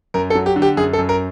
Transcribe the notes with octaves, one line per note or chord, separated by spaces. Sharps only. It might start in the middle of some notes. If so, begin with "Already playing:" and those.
F#2 A#4
A4
F#3
G4
D3
G4
F#2 G#4
A4
F#2
A#4